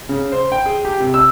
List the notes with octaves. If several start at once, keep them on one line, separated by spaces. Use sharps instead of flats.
C#3
C5
G5
G#4
G4
C3
E6